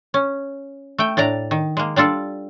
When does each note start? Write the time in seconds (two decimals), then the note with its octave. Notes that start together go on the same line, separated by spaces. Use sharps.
0.14 C#4
0.98 A3 G5
1.17 A2 D4 D5 A#5
1.51 D#3
1.77 G#3 A#3
1.96 G3 D4 F4 A4